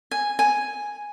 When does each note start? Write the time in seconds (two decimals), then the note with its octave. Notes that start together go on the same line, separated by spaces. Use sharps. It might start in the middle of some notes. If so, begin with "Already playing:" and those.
0.11 G#5
0.39 G#5